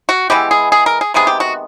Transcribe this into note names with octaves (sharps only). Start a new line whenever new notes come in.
F#4
E3 G#3 B3 G4
G#4
G#4
A#4
G#4
C3 D#3 G#3 B3 G#4
G4
F#4